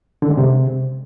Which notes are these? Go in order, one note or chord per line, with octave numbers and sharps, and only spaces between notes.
D3
G#3
C3